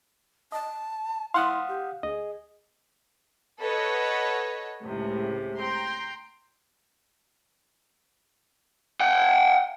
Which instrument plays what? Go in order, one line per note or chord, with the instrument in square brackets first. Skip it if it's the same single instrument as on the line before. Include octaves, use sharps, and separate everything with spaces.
[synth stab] D#5 [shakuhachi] A5
[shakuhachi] E4 [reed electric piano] F5 F#5 D#6 [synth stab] C6
[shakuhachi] G4
[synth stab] D2 [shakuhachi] G#4 [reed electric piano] D#5
[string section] A4 B4 C#5 D#5 F#5
C#2 A2 C3
G5 A#5 C6
[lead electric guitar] F#5 G5